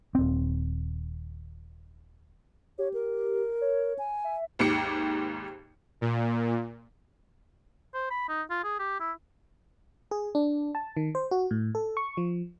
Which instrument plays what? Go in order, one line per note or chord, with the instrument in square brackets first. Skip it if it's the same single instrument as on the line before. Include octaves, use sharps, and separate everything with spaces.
[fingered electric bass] D#1 C4
[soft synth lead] G4 [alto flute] C#5
[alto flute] A#4
[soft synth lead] C#5
[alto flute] G#5
[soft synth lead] E5
[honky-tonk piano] G#1 D#2 G#2 G4 C#7
[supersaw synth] A#2
[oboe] C5
B5
D#4
F4
G#4
G4
E4
[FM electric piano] G#4
D4
A5
D#3
C5
F#4
A2
A4
C#6
F3